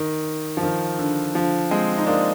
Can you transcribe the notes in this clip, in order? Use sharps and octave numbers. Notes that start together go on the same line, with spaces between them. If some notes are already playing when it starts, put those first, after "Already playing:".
Already playing: D#3
F3
D#3
D3
D3 F3
G#3 C4
D#4
A#3 D4